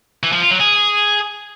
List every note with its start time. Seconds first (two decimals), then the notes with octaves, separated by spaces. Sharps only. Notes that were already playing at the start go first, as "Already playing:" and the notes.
0.23 E3
0.32 F3
0.42 F4
0.51 F#3
0.60 G#4